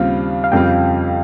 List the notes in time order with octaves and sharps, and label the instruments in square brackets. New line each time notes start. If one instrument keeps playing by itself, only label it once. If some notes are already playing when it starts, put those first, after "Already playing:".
Already playing: [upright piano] D#2 C#3 G3 C4 F4 [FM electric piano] F5
[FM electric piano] F5
[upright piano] F2 C#3 G3 C4 F4 [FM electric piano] G5